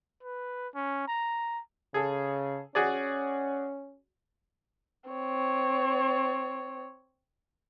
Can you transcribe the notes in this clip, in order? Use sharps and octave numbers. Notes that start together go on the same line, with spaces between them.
B4
C#4
A#5
C#3 G#4 A4
C#4 F#4 G#4 D5
C4 C#5